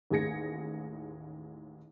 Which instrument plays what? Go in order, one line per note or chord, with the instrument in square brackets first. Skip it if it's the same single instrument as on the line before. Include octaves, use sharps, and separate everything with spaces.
[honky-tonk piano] A1 D#2 G#4 G#6 A#6 C#7